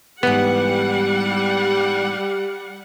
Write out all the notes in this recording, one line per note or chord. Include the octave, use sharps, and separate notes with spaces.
G#2 E3 G3 B3 G4 F#5